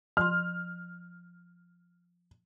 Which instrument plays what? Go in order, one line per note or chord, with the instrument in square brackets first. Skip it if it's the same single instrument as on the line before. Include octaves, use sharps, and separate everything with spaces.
[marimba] F3 C6 [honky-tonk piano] F6